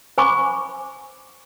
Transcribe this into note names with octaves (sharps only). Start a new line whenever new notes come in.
C5 G#5 B5 C#6 D6